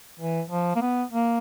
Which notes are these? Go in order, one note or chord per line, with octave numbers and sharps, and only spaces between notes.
E3
F3
A#3
B3
A#3